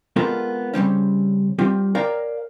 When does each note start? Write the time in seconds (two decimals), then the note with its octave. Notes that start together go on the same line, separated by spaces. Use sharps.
0.16 G#3 B3 C4 F4 A4 A#4
0.74 C#3 G3 C4 C#4
1.59 G3 C4 F4 G4
1.95 A#4 C#5 D5 F5 G5 A#5